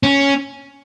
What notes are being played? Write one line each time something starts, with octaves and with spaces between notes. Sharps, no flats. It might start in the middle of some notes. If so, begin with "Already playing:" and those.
C#4